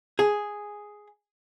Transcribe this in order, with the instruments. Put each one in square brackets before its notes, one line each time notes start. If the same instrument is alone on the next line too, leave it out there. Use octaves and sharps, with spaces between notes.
[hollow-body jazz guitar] G#4